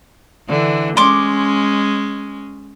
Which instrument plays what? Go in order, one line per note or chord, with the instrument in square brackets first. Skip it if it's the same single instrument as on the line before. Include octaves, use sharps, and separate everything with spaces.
[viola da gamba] D3 E3
[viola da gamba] G#3 C#4 [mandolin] C6 D6